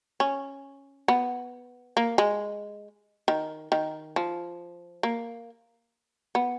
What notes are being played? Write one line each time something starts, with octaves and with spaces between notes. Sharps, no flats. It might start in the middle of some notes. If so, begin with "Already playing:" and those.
C#4
B3
A#3
G#3
D#3
D#3
F3
A#3
B3